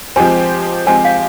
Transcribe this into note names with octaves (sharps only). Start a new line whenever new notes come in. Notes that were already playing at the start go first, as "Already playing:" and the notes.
F3 G#3 C4 G4 C5 G#5
F3 G#3 C4 G4 C5 G#5
F5